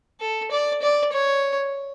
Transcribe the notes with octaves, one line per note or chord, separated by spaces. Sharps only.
A4
D5
D5
C#5